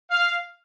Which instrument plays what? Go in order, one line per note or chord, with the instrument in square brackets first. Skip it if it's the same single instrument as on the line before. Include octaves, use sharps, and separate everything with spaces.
[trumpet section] F5